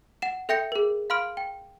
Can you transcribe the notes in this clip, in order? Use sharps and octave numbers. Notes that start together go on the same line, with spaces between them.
F#5 E7
A4 E5 G5 G6 A#6 C#7
G#4 A#4
F5 B5 C6 F6 D7
G5